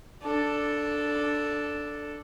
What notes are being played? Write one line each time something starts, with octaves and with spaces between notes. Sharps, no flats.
D4 A4